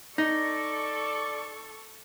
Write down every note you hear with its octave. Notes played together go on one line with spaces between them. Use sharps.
D#4 A4 D5 C#6